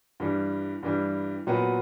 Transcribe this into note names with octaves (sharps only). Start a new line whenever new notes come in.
G2 E3 G3
G2 E3 G3
A#2 F#3 B3 F#4 B4